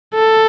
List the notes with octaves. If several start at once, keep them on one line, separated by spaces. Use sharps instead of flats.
A4